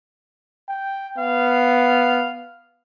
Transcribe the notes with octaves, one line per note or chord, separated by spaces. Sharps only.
G5
B3 F5